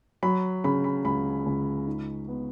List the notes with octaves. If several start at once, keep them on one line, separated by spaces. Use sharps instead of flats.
F#3 B5
C#3 B5
B5
C#2 B5
C#2
D#4
B3